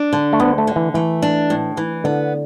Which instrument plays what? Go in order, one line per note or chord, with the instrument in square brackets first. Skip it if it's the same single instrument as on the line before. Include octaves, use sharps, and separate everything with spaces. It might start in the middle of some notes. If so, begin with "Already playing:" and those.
Already playing: [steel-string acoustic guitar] D4
D3
[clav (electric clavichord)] A3
[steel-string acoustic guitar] D2 [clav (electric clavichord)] B3
[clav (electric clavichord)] A3
[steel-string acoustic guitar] D3
[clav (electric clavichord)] E3
[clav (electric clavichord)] E3 [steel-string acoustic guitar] A3
[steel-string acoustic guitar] D4
A2
E3
[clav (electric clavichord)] D3 [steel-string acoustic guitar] B3